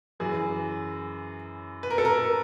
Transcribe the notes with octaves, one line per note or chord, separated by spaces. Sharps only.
F#2 C#3 E3 G#4
B4
A#4
A4
A#4